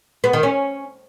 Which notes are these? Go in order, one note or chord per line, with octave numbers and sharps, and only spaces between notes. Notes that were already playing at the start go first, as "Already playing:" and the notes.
B3
D#3
C#4